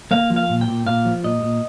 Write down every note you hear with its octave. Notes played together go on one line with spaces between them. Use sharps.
A#3 F5
F3
F5
A#2
G5
A#2
A#2 F5
F3
A#2 D#5
A#2